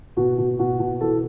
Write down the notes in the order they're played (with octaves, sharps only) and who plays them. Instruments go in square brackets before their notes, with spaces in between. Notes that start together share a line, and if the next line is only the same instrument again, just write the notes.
[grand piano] B2 F#4
B2
B2 F#4
B2
E3 A4